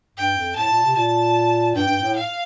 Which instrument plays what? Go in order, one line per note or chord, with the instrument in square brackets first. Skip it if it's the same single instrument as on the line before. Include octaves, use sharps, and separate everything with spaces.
[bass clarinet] G2 [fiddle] G5
[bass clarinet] F2
[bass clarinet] A2 [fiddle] A5
[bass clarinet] A#2
C3
[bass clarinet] A#2 [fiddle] A5
[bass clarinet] G2 [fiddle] G5
[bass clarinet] G2
A2
[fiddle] F5